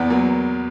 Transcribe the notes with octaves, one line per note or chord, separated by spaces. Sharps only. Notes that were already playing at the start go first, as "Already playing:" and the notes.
Already playing: E2 B3
F#3 A#3